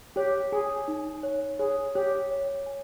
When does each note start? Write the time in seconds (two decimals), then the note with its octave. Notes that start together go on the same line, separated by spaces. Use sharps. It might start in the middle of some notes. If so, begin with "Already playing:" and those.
0.16 G4 C#5
0.52 G#4 G#5
0.88 D#4
1.23 C#5
1.59 G#4 C#5
1.95 G4 C#5
2.31 C#5
2.66 G#5